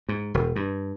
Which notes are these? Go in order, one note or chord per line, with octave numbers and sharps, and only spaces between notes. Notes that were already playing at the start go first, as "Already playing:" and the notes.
G#2
E1
G2